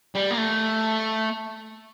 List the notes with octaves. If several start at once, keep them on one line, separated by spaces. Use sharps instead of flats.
G3
A#3
A3